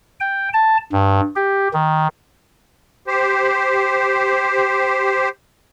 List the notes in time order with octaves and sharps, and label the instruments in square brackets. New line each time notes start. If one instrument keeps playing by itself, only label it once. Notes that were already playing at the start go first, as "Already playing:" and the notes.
[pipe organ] G5
A5
G2
G4
D#3
[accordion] G4 C5